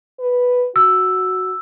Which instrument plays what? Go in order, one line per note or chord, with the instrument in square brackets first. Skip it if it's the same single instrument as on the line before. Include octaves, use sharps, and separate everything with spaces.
[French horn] B4
[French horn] F#4 [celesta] E6